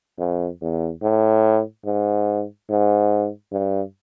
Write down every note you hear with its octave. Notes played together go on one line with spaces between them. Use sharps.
F2
E2
A2
G#2
G#2
G2